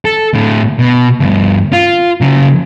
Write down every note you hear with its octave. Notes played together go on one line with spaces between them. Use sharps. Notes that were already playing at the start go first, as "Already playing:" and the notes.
A4
A2 D3
B2
D2 G2
F4
C#3 F#3